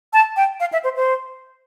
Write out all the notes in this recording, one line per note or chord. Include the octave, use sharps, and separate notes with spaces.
A5
G5
F5
E5
C5
C5